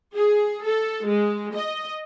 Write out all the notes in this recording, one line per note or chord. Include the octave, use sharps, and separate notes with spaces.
G#4
A4
G#3
D#5